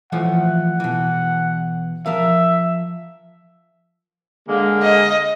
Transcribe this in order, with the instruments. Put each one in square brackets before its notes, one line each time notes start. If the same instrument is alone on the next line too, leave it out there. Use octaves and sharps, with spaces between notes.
[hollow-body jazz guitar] E3 F3 A3 [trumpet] F#5
[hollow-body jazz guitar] B2 E3
[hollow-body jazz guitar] F3 A#4 F5 [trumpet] E5
[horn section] D3 G#3 A#3
[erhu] D#5